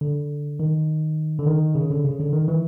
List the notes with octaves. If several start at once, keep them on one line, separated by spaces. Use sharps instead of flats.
D3
D#3
D3
D#3
C#3
D3
C#3
D3
D#3
E3